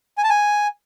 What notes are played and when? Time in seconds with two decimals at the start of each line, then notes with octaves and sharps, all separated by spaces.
0.18 G#5
0.24 A5
0.30 G#5